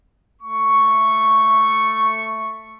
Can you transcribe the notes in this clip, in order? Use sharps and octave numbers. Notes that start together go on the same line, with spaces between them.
A3 C#6